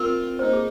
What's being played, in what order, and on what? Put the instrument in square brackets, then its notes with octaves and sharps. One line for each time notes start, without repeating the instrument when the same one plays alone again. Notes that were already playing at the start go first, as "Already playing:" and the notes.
Already playing: [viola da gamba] C4 F4 [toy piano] A#4
[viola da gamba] A#3 D#4 [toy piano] C5
[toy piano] G#4